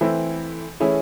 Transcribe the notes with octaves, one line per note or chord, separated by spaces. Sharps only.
E3 A3 C4 E4
E3 A3 C#4 E4 G#4